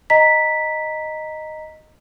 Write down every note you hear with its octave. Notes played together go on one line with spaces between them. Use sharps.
D#5 A#5 B6